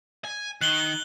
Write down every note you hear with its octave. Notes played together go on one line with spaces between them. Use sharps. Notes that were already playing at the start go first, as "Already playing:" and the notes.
G#5
D#3 F#6 F#7 G7